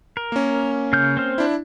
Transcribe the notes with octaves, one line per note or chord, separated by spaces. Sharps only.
A#4
A#3 C#4
C#3 F6 G6
C4 C5 F6
D4 E4